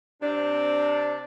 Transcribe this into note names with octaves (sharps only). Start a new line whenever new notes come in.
C3 C4 D4